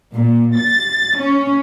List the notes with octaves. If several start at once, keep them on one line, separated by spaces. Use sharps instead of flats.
A#2
A6
C#4